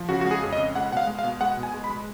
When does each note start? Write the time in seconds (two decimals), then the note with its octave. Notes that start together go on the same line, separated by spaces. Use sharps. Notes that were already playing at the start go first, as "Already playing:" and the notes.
Already playing: F3
0.09 C#3 F#4
0.21 G#3 F#4
0.31 G#4
0.43 F2
0.53 D#5
0.58 C#3
0.75 G#3 F#5
0.91 B2 F#5
0.97 F5
1.07 G#3
1.19 F5
1.24 B2
1.41 G#3 F#5
1.57 B2
1.63 G#5
1.74 G#3
1.84 B5
1.90 G#3